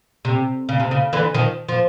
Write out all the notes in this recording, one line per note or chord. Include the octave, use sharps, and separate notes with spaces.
C3
C#3
C3
C#3
D3 E3
D#3 F3
F3